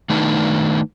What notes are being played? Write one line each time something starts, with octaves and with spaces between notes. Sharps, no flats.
D#3 A3 D4 D#4 B4